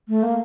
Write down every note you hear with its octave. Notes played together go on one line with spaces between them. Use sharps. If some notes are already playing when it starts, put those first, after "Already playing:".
A3
A#3